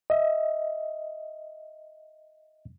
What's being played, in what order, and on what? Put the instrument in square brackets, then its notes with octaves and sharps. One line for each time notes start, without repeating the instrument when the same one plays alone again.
[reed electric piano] D#5 E5